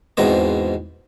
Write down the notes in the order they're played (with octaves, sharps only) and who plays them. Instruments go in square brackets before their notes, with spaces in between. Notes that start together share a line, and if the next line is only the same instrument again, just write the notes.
[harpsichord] E2 G#2 B2 C4 D#5